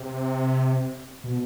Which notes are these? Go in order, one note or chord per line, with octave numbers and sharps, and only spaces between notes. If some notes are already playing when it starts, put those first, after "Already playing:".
Already playing: C3
B2